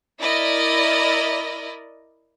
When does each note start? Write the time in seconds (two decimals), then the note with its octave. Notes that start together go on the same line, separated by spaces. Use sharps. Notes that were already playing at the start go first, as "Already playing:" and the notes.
0.20 E4 A#4 D5 D#5